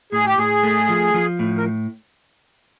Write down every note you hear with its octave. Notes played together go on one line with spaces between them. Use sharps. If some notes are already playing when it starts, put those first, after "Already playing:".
A2 G#4
G4
A2 G#4
A3
F3
F3
A2
A#4